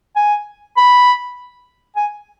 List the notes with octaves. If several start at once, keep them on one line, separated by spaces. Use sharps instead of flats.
G#5
B5
G#5